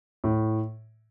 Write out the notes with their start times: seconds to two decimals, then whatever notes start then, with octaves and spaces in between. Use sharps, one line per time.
0.24 A2